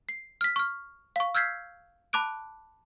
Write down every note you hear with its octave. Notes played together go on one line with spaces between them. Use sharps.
C7
F6 B6
C#6 F6
F5 C#6
E6 F6 G6 G#6 B6 C7
A5 B5 D6 F#6 D7